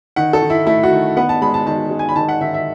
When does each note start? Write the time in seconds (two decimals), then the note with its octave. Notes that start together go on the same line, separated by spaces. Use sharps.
0.16 D#3 F#5
0.33 A4
0.42 D#3
0.50 E4
0.67 A3 E4
0.83 F#4
0.91 D#3
1.17 B3 F#5
1.29 A5
1.42 G#3 B5
1.54 A5
1.66 D#3 A5
1.91 G#3
1.99 G#5
2.09 B5
2.16 D#3 A5
2.28 F#5
2.41 D#3 E5
2.54 E5